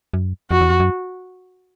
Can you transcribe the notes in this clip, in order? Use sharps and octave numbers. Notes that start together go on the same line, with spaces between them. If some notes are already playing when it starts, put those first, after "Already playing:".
F#2
F2 F#4
E2
F2
F#2